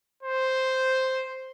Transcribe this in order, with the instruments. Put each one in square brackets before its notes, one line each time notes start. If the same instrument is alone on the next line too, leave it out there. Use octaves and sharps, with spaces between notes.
[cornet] C5